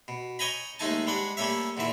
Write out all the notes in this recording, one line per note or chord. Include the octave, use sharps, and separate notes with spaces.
B2
C#5 D#5 G5 G#5 A#5 B5
D#2 G#3 A3 D#4 G#5 A5
G3 G#3 D4 F#5
G3 A3 A#3 C#4 C#5 E5
E2 A#2 D3 E4 E5